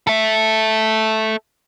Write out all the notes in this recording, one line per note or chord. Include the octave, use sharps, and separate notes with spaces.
A4 E5